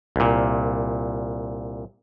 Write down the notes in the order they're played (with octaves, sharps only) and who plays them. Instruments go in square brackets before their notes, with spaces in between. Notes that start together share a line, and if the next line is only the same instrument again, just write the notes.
[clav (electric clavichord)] C2 A#2